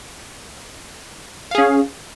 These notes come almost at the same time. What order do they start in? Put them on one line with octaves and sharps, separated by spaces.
F5 G#4 C#4